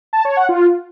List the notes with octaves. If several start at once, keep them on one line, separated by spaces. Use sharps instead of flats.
A5
C#5
F#5
F4